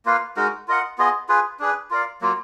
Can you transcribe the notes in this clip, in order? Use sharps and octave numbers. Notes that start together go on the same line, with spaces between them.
A#3 F4 B4 F5
G#3 D#4 F#4 A#4
F4 A#4 D#5 F#5
B3 F4 G#4 D#5
F4 G#4 B4
D4 G#4 B4
F4 A#4 D5 F5
F#3 A#3 F4